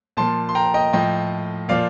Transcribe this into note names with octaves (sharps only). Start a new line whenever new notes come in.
A#2 F3 A5 C6
C6
G5 A#5
D#5 G5
A2 F3 D#5 G5
A#2 F3 D5 F5